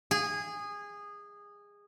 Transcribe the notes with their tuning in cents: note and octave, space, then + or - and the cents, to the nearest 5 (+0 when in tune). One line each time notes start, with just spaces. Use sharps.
G#4 -20